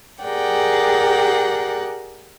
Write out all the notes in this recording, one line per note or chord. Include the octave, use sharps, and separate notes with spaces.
G4 G#4 A#4 D5 F#5 G5